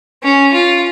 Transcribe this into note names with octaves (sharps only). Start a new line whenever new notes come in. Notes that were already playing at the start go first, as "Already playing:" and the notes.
C#4
F4